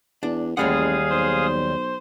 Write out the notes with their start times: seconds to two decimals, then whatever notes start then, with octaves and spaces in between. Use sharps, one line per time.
0.23 E2 D4
0.57 A1 D#2 G3 G#3 G#4 F5 F#5 D#6
1.11 B1 C5